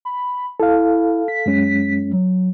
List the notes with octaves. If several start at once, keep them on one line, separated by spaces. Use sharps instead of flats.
B5
E4 A4 F5
B6
F#2 G#3 C#4
F#3